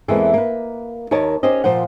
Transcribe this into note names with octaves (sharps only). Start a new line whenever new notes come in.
E2 E3 G#3 A#3 C4 A4
A#3 B4
D#2 A#4 C#5 D#5 A5
C#4 G4 C5 D#5
A#2 F3 C5 F#5